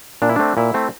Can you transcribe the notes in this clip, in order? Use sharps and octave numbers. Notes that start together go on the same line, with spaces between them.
A#2 D4
E4
A3 C4 D4
A#2 E4
A3 C4